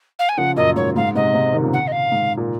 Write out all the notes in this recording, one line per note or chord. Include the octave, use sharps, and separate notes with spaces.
F5
G#5
C#3 F3 F#5
F#2 A#2 D#5
G#2 C#5
G#2 F5
G#2 C3 D#5
G#2 C3
C3 D#3
A#2 C#3
F#5
D#5
F5
G#2
A#2